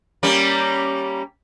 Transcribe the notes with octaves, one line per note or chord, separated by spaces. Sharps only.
G3 A#3 C#4